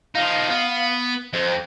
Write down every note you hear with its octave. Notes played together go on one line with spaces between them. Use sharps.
F3 D#4 F5
B3
F2 C5